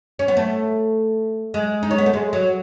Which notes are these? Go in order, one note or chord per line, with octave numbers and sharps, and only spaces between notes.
C#4
B3
A3
G#3
D#4
C#4
B3
A3
G#3
F#3